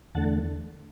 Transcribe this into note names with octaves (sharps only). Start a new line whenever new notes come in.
E2 D3 A3 F#5 A5